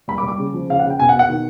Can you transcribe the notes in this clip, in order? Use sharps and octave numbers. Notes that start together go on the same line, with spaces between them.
G3 B5
D6
G3
D6
C#3
F3
C#3 F5
C#3 F#5
G5
B2 G#5
F#5
B2
F#5
D#3